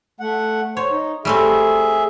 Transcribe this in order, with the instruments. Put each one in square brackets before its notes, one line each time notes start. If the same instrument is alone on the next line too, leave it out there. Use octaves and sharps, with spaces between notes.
[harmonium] A3 F#5
[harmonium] C5 [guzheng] C#5
[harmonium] D#4
[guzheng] G3 A3 C4 [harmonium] G#4 E5